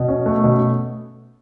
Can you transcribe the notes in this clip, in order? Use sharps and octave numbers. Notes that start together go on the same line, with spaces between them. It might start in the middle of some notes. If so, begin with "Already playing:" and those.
Already playing: B2
C#4
A3
B2